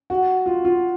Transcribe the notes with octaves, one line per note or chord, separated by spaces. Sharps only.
F#4
F4
F4